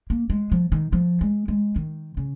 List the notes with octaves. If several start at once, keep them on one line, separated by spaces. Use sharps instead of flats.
A#3
G#3
F3
D#3
F3
G#3
G#3
D#3
C#3